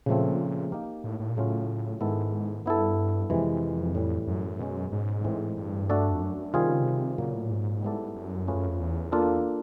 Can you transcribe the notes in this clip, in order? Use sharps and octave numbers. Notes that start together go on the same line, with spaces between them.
A#2 C#3 F3 A3 C4
A#3 D#4 G4 A#4
A2
A2
A#2
A2 C#3 F#3 A3 C#4 F4
G#2 D#3 G#3 B3 E4 A4
G2 B3 E4 A4
F2 C3 E3 G#3
A2 E3 G3
F#2
B2 G#3 C#4
G#2
A2 E3 G#3 C4
G2
A3 D4 F#4 A4 D5
F2
F#2
F#2
C3 D#3 G3 C4 F4 G#4
C#3
C3
A#2 C#3 F#3 A#3
A2
G#2
G3 B3 E4 A4 D5
F#2
A3 C#4 F4 G#4 B4
F#2
F2
E2
A#3 D4 F4 A4